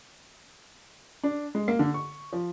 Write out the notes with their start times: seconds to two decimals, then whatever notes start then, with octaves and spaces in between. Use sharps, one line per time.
1.24 D4
1.55 G#3
1.68 A#3
1.79 D3
1.94 C#6
2.32 F3